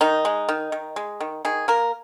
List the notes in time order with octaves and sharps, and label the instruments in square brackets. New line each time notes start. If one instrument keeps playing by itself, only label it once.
[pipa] D#3 D#4
G#3
D#3
D#3
G#3
D#3
D#3 G#4
A#3 A#4